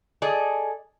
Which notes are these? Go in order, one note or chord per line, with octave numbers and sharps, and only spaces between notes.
G#4 A4 D5 D#5